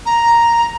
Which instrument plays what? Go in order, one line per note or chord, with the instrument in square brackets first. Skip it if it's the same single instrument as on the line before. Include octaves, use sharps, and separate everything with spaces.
[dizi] A#5